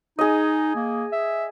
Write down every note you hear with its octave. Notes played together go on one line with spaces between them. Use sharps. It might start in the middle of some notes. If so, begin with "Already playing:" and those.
D#4 G#4 D#5
A#3
E5